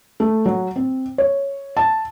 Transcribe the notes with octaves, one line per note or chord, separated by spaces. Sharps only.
A3
F#3
C4
C#5
A5